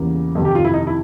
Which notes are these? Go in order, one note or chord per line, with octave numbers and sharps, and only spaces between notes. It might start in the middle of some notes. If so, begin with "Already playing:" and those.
Already playing: E2 C#3 E3 G3 A#3
F2 C3 D#3
G4
F4
E4
D#4
E4